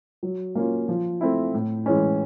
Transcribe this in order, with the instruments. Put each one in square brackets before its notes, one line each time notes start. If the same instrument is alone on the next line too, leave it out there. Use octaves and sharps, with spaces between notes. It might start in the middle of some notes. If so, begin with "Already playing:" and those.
[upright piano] F#3
A#3 C#4 F4
F3
A3 C4 E4
A2
E3 G#3 C#4